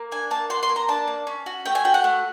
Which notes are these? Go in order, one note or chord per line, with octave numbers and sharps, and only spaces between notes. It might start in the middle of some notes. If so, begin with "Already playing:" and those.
Already playing: A#3
D4 G#5
A#3 A5
F#4 C6
C6
A#3
A#5
D4 A5
A#3
C#4
F#4
A3 G5
G#5
F#4 G5
F#5
A3